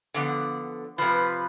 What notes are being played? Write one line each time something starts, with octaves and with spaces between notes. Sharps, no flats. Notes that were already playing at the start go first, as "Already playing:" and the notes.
D3 F3 B3
C3 F3 B4